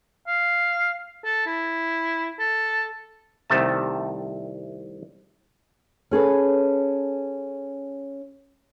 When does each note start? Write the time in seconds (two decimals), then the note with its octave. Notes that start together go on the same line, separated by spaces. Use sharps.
0.27 F5
1.24 A4
1.46 E4
2.39 A4
3.50 C2 C3 D#3 A3 A5
6.11 C#4 G#4 A4 B4